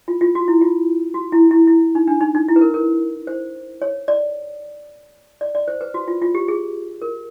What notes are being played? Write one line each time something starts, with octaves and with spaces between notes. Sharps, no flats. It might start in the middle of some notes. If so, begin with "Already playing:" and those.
F4
F4
F#4
E4
F4
F#4
E4
E4
E4
D#4
D4
D#4
D#4
E4
B4
A#4
A#4
C5
C#5
D5
D5
D5
C5
B4
F#4
F4
F4
G4
G#4
A#4